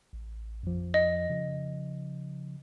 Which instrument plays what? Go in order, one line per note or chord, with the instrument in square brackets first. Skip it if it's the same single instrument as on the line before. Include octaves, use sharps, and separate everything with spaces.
[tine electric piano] A1
F2 F3
[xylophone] D#5
[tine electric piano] C#3 F3